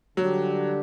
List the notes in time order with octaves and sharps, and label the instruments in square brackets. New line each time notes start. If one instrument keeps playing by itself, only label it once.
[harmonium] D3 G3 D4 G4 [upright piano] F#3